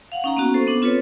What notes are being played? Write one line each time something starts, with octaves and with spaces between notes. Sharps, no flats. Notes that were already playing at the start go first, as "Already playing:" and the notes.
F5 F#5
C#4 D#4 A#5
A#3 B3 C#4 F#4
A4 C5 C#6
B3 D4
C4 F4 A4 B4 C#5